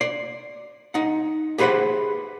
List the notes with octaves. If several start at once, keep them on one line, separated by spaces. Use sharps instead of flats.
D5 C6
D#4 F#5
G4 G#4 B4 C5 E5 F#5